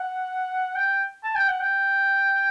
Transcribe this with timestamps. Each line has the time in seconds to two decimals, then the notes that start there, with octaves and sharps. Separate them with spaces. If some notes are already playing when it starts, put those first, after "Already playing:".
Already playing: F#5
0.76 G5
1.23 A5
1.35 G5
1.48 F#5
1.60 G5